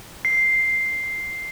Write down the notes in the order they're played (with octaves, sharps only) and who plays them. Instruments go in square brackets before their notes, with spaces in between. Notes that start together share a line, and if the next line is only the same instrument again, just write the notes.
[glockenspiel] C7